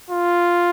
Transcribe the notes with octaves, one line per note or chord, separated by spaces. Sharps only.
F4